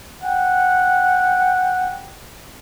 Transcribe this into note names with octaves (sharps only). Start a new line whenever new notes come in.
F#5 G5